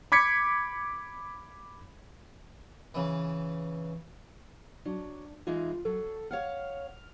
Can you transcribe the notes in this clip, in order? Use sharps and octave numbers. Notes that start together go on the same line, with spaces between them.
B5 D6 G#6 B6 C#7
C#3 E3
F#3 D4
E3 G#3 D#4 F4
F#3 A4
C#5 F5 F#5 F6